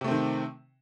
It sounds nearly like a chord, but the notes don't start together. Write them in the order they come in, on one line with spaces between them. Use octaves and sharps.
C3 A3 C4 D#3